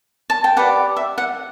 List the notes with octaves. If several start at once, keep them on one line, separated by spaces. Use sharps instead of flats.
A5
G5
G4 B4 D5 F#5
E5
F#5